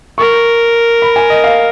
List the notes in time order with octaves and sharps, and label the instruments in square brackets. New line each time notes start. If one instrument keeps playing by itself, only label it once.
[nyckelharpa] A#4 [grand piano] C#6
[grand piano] B5
G#5
D#5
F5